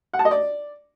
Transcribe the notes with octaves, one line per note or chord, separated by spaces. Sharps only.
F#5
A5
D#5
D5